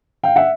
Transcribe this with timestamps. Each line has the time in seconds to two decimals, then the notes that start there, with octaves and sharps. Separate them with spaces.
0.23 F5 G5
0.36 E5 F#5